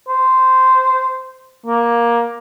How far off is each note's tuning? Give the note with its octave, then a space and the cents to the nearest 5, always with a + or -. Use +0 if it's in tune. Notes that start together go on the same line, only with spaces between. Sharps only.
C5 -10
A#3 +10